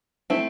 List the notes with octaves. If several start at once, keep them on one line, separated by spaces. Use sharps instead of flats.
A3 C4 E4